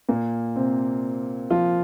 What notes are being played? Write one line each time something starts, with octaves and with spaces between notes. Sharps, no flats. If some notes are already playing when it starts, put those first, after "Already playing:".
A#2 A#3
C3 C4
F3 F4